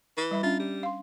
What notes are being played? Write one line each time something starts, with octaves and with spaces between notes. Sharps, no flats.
E3
G3 E5 B5
C#4 D4 F4 E5
G3
F5 C6